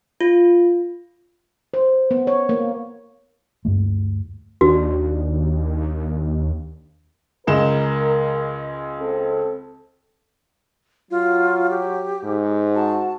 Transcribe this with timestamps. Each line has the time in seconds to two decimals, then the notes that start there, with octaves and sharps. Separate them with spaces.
0.21 F4
1.74 C5
2.11 B3
2.27 C#5
2.49 A#3
3.65 D2 G2 G#3 A3
4.61 D#2 D4 F#4
7.47 C#2 G#3 A#4 E7
9.00 C4 A4
11.11 F#3 F4
11.70 G4
12.24 G#2
12.75 F#4 A5